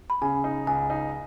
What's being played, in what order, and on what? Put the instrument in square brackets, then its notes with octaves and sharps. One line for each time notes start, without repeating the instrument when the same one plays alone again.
[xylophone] B5
[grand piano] C#3 [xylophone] G#5
[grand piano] D#4
[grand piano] C#2 [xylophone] G#5
[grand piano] D#4